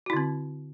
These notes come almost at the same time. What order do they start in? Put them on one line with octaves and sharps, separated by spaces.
F#4 E4 D3 C4